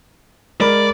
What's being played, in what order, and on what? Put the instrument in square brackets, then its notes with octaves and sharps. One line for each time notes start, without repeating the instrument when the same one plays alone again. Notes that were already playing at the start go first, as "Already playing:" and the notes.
[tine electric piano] G#3 A#4 B5 [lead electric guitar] D5